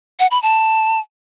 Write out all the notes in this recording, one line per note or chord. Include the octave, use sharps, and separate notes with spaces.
F#5
B5
A5